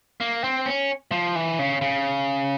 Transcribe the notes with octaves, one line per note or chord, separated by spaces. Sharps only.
A#3
C4
C#4
F3
E3
C#3
C#3